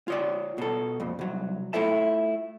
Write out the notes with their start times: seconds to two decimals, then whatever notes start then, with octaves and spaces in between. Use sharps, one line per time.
0.08 F4 C#5 D5
0.58 B2 A4
1.00 F2 A#2
1.19 C2 F#3
1.73 A3 E4 F4 A4 E5 A5